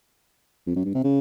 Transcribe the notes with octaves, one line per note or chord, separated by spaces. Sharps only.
F2
F#2
G2
C3
C#3